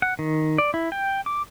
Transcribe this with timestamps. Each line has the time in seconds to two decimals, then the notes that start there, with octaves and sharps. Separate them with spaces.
0.02 F#5
0.19 D#3
0.58 D5
0.74 E4
0.92 G5
1.26 D6